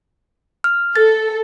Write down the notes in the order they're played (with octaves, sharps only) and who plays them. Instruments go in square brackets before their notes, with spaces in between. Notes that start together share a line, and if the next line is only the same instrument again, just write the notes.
[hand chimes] F6
[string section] A4 [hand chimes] A6